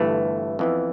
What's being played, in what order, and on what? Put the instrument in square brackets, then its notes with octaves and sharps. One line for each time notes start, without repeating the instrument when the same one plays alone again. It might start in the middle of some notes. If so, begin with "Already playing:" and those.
Already playing: [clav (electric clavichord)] G1 G2 E3 A3
F2 E3 B3